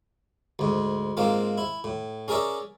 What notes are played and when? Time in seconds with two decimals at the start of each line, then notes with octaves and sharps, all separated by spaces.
0.59 D2 G#2
1.17 G#2 A#3 C4 F4
1.58 E4
1.84 A2
2.28 C#4 G#4 A#4 D5 E5